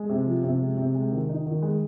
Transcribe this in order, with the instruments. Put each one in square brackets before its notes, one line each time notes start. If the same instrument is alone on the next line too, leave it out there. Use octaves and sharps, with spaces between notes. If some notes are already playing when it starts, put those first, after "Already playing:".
Already playing: [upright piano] G#3
C3
F3
C3
G#3
C3
G#3
D#3
D#4
D#3
G#3